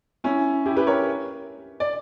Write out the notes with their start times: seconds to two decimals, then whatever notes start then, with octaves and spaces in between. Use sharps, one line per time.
0.24 C#4 E4
0.66 E4 G4
0.76 G4 B4
0.87 A#4 C#5
1.80 D5